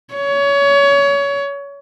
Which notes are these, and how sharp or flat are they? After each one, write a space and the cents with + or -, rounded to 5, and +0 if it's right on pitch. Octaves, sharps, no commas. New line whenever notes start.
C#5 +25